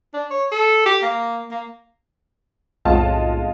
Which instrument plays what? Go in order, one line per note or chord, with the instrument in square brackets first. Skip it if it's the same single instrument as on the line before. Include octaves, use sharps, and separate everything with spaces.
[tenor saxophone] D4
C#5
A4
G4
A#3
A#3
[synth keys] B1 F2 A2 [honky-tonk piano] G#3 F4 A5